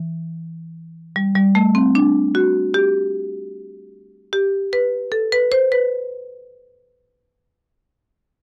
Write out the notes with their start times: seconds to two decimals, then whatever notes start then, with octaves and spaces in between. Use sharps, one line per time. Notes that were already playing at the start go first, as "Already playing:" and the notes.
Already playing: E3
1.16 G3
1.35 G3
1.55 A3
1.75 C4
1.95 D4
2.35 F#4
2.74 G4
4.33 G4
4.73 B4
5.12 A4
5.32 B4
5.52 C5
5.72 B4